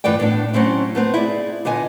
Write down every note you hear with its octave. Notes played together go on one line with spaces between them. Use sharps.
G2 E3 A3 D5 G5
A2 B3 D4
F#3 A3 C4 C#4 E4
A3 B3 C4
E4 G#4 D5
A#2 D3 B3 D#5 G#5